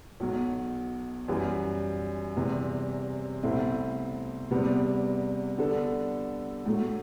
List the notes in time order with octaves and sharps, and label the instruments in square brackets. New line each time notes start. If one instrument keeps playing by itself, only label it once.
[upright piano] B1 B2 F#3
F#2 E3 G3
E2 C3 E3 G3 C4
C2 B2 A3 C4 E4
E2 C3 G3 B3
D3 G3 B3 D4 A4
A2 F#3 A3